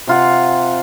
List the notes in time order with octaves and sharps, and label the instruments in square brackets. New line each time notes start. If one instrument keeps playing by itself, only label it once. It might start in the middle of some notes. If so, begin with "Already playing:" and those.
[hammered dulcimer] C3 F4 F#5